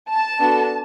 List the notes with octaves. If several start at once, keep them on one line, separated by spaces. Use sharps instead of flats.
A5
B3 D4 F#4 A4